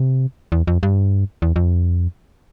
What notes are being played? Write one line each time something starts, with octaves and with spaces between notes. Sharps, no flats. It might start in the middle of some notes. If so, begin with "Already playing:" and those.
Already playing: C3
E2
F2
G2
E2
F2